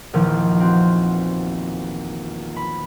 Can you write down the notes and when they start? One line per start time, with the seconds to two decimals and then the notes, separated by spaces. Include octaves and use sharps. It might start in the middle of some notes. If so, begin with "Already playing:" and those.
0.14 A#1 E2 D#3 F3
0.60 C4 F#4
2.56 B5